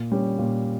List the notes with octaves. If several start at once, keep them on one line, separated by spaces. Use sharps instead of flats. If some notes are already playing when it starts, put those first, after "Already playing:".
Already playing: A#2
G3 C#4
A#2